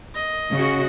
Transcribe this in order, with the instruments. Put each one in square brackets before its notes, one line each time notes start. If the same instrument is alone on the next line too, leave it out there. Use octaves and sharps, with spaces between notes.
[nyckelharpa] D#5
[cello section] C#3 F#4